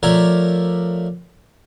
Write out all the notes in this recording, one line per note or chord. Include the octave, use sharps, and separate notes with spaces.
F3 A3 A#4 C#5 D5 E5